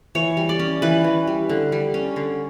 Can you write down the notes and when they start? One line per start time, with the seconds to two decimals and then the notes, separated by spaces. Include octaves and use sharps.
0.15 E3 C#5
0.37 G3
0.49 D5
0.59 C#4
0.82 E3 B4
1.04 E3
1.27 G3
1.49 D3
1.72 G3
1.94 C#4
2.16 D3